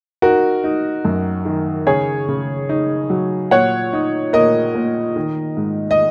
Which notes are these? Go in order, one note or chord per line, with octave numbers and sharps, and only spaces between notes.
D#4 F#4 A#4
D#4
F#2
D#3
C#3 G#4 C#5
C#3
D#4
F#3
A#2 C#5 F#5
D#4
A#2 A#4 D#5
A#2
D#3
G#2
D#5